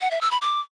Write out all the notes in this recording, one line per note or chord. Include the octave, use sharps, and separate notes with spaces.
F#5
E5
E6
B5
D6